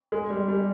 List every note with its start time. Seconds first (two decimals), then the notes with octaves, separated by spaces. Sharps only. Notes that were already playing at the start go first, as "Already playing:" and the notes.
0.12 G#3
0.30 G3
0.48 G3